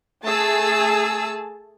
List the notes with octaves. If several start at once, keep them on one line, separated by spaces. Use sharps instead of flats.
A3 G#4 A5 E6